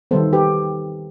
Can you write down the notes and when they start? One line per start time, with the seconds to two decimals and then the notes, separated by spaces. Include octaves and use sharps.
0.11 D#3 G3 B3 A4 C5
0.33 G4 B4